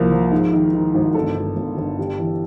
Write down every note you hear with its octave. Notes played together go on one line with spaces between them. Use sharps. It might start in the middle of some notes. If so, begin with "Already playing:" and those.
Already playing: C2 F3 A#3 A#4
F3
G#2
D#3
D#3
G#1
G1 A4
G1
G1
G1
G3
E3